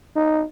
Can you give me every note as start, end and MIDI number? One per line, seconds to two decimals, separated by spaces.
0.15 0.43 63